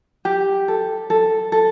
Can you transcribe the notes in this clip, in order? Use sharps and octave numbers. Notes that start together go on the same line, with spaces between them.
G4
A4
A4
A4